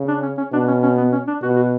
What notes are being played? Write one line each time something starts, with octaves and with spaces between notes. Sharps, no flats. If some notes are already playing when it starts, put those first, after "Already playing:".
Already playing: C#3
D4
C#4
C#4
B2 D4
C#4
C#4
B3
C#4
D4
B2 F#4
F#4